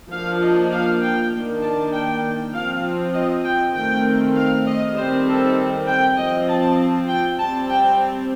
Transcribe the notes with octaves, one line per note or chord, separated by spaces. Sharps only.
F3 A#3 D4 F5
D#5
F5
G5
D#3 A#3 D4
A5
G5
F3 C4 F5
D#5
G5
D#3 A3 C4 G5
F5
D#5
D#3 G3 C4 C5
A4
G5
F3 C4 D#5
A5
G5
G3 C4 A5
G5